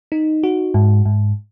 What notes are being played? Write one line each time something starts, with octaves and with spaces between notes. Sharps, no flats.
D#4
F#4
G#2
G#2